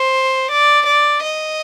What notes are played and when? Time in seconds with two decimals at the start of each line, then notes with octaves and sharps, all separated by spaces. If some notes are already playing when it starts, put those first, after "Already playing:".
Already playing: C5
0.51 D5
0.86 D5
1.23 D#5